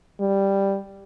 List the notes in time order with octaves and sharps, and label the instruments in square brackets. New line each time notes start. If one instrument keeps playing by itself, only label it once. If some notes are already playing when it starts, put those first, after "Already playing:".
[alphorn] G3